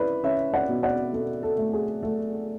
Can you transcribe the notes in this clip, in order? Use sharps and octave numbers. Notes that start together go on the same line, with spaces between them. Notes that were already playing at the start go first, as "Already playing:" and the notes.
Already playing: C#4 E4 B4 D5
C#4 C#5 E5
D5 F#5
B2
D5 F#5
B2 A4
A4
A3
G#4
A3 A4